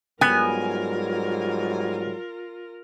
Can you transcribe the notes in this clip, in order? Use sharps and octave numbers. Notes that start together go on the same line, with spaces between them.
G#2 F#3 G3 B3 F4 A#4 G#5